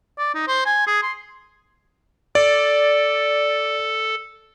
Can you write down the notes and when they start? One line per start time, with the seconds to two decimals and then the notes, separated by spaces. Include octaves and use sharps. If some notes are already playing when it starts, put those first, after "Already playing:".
0.18 D5
0.35 D#4
0.48 C5
0.66 G#5
0.87 G#4
1.03 C6
2.35 A4 D5